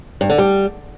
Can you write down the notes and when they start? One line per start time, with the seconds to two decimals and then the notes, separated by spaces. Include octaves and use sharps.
0.21 G2
0.30 D3
0.38 G3